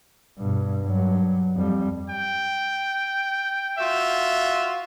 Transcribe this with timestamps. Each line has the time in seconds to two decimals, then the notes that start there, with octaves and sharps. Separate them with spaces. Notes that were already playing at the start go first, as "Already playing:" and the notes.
0.39 G2 B2
0.84 G2 F#3
1.56 F2 G3
2.10 G5
3.79 F4 F#4 E5